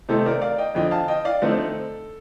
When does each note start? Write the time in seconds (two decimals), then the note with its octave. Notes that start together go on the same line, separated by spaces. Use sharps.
0.09 C3 D#3 A3 D#4 A4 C5
0.26 A#4 D5
0.42 D5 F5
0.58 D#5 G5
0.75 F2 D3 F3 D#5 G5
0.91 F5 A5
1.08 D#5 G5
1.25 D5 F5
1.42 D3 F3 A3 C4 D#4 A4